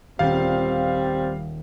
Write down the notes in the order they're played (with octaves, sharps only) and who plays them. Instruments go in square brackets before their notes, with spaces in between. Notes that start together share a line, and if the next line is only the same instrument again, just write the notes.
[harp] D#1 [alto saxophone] G3 [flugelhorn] C4 [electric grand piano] F5